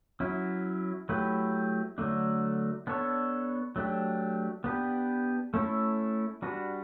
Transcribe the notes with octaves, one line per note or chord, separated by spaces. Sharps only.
F#3 C#4 E4
F#3 A3 E4 G4 B4
D3 F#3 A3 D4
B3 D4 A4 C#5
F#3 A3 D4 G4
B3 D4 G4 B4
A3 C#4 E4 A4
G3 D4 F#4 B4